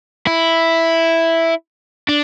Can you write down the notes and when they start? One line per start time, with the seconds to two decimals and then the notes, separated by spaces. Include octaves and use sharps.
0.27 E4
2.09 D4